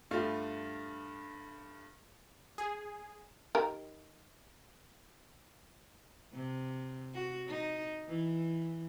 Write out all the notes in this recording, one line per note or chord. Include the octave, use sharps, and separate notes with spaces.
G2 G3 A3 F4
G#4
D#3 G4 A#4
C3
F#4
D#4
E3